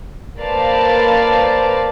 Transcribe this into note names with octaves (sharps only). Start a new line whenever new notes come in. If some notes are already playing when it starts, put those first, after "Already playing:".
A#3 B4 C5 D5 F5 A5